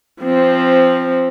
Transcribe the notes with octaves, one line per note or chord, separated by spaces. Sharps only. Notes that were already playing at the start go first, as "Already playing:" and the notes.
F3 C4